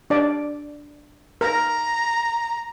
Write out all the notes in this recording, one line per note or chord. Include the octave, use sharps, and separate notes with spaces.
D4 D5
A#4 A#5